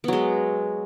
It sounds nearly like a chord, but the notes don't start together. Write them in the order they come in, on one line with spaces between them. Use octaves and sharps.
B3 F#3 G#3